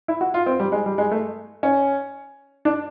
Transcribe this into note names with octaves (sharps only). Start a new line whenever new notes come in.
E4
F#4
F4
C4
G3
G#3
G3
G#3
A3
C#4
D4